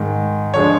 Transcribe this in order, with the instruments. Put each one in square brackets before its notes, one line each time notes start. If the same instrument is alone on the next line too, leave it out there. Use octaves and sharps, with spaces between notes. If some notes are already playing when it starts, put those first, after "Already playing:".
Already playing: [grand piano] G#2 D#3 G#3
D3 F3 G#3 C#5